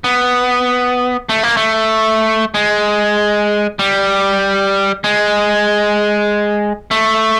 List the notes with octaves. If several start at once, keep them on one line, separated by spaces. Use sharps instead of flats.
B3
A3
A#3
A3
G#3
G3
G#3
A3